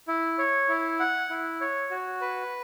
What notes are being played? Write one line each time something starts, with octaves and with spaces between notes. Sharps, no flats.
E4
C#5
E4
F#5
E4
C#5
F#4
B4